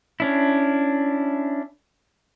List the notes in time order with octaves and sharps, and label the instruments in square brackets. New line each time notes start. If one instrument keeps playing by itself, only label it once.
[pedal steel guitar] C#4 D4 E4